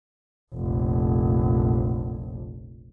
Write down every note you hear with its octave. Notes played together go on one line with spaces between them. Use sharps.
F1 A#1